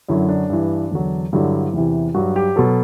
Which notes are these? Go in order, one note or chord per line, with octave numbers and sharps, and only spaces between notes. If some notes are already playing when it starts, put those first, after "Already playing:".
F#2 D3 F#3 E4
D4
G2 E3
E2 D3 F#3
G2 D3 F#3 E4
E2 C3 E3
G2 F#3 F#4
G4
B2 F#3 A4